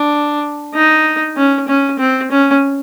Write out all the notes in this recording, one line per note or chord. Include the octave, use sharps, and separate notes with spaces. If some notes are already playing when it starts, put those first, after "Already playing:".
Already playing: D4
D#4
C#4
C#4
C4
C#4